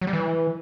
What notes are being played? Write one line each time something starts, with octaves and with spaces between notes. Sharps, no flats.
F#3
G3
E3